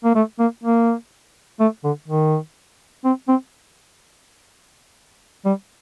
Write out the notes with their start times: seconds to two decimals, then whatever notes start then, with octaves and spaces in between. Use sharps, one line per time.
0.04 A#3
0.15 A3
0.39 A#3
0.63 A#3
1.60 A3
1.84 D3
2.08 D#3
3.05 C4
3.28 C4
5.45 G3